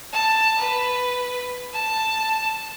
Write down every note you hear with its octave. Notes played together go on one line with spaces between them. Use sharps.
A5
B4
A5